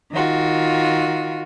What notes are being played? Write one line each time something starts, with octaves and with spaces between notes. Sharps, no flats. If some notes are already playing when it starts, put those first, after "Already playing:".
D#3 F4 F#4